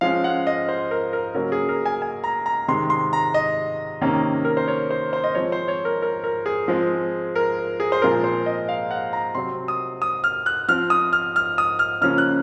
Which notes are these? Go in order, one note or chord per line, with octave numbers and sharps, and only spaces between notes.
F3 G#3 C#4 F5
F#5
D#5
C5
A#4
A#4
C#3 F#3 A#3 C#4 A#4
G#4
A#4
G#5
G#5
A#5
A#5
C3 D#3 G#3 C6
C6
A#5
D#5
C3 D#3 A#3 C#4
A#4
C5
C#5
C5
C5
D#5
F3 G#3 C4 C#5
C5
C#5
A#4
A#4
A#4
G#4
F3 G#3 C4
A#4
G#4
C5
A#2 F3 G#3 C4 A#4
C5
D#5
F5
F#5
A#5
C3 F#3 C4 C6
D#6
D#6
F6
F#6
F3 C4 F6
D#6
F6
F6
D#6
F6
C#3 F3 A#3 C#4 F6
F#6